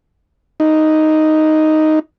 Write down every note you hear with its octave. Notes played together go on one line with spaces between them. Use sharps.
D#4